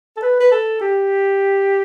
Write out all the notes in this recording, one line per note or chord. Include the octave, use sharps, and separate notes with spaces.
A4
B4
B4
A4
G4